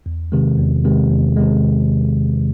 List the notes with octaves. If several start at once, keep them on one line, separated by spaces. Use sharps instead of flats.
E2
C3 D#3 G#3
E2
C3 D#3 G#3
E2
C3 D#3 G#3